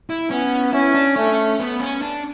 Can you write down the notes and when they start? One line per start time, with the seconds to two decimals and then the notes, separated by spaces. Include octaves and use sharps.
0.10 E4
0.31 B3 C#4
0.73 C#4 E4
0.94 D4
1.16 A3 C#4
1.60 B3
1.80 C#4
2.02 D4